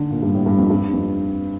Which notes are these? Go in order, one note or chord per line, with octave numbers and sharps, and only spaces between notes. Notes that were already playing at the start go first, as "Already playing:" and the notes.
Already playing: D3
A#2
G2
A2
G2
F2
G2
F2